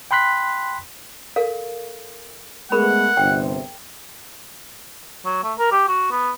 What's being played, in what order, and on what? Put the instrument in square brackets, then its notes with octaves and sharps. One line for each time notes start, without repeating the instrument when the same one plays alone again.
[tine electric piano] G5 B5 C6 F#6 B6
[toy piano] A4 A#4 F5
[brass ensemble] G#3 A3 B3 [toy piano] G#4 A#4 B5 [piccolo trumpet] F#5
[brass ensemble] G1 C3 [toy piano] G5
[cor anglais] F#3
A3
A#4
G4
F#4
B3